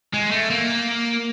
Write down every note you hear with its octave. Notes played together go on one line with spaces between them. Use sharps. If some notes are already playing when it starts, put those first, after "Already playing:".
G#3
A3
A#3